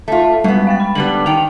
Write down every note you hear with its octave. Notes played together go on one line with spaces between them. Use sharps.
A3 F4
F#2 G3 G#3 B3
F5 G5 A6
B5
D3 G3 B3 F#7
D#3 G5 F7